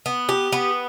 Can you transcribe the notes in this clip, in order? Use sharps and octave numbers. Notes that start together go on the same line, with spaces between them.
B3
G4
B3